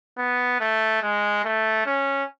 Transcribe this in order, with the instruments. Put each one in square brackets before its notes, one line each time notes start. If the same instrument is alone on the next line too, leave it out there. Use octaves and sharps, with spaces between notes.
[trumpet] B3
A3
G#3
A3
C#4